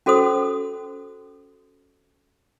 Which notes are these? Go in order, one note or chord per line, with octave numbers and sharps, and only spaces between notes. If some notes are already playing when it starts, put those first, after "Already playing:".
C#4 F#4 A4 C5 D#6